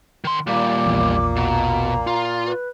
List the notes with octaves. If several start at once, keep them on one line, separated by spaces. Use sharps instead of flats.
D#3 C6
D#2 A#2 G3 A#3 D6
A#1 E2
B2 A#5
F4
B4